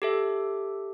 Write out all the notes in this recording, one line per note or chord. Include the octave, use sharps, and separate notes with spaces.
G4 A4 E5